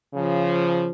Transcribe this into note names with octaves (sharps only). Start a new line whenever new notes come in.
C#3 F3